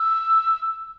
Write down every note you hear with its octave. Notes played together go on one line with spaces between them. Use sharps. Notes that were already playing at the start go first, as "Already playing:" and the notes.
Already playing: E6